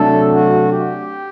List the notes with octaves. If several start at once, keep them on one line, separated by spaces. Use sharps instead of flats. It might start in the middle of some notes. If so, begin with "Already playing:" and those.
Already playing: C3 F#3 A3 D4 A4
F#4
G4